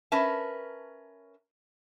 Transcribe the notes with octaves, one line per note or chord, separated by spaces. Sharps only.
C#4 A#4 B4 E5 A5